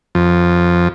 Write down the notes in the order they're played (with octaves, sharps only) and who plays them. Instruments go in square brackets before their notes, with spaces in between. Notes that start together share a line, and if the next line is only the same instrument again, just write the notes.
[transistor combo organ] F2